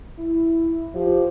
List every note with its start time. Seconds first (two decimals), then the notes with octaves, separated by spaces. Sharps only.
0.17 E4
0.95 F3 G4